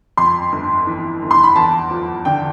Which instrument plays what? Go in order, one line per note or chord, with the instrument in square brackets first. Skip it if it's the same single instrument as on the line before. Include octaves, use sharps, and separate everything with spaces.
[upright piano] F2 C6
G1
E3
G1
C6
B5
E2 A5
F3
D3 G5